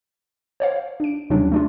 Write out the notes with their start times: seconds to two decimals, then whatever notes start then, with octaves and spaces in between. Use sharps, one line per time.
0.60 C5 C#5 F5
1.00 D4 D7
1.30 D#2 C3 F#3 G3 C#4 D4
1.52 A3 D4 F4